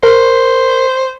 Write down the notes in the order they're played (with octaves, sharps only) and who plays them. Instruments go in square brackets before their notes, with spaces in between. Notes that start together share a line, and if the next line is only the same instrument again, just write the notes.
[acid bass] A#4 [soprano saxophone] C5